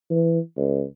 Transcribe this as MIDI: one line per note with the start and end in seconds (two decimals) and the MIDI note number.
0.11 0.39 52
0.57 0.83 37